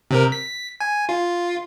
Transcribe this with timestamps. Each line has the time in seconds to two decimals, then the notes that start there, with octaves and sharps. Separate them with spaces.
0.11 C3 C4 A#4
0.32 B6
0.80 G#5
1.09 F4